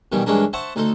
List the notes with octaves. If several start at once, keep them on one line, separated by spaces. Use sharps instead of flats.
B2 D#3 E3 G3
G2 E3 G#3 C#4 D4 A#4
C5 E5 F#5 A5 C#6
D2 D#4 A4 C6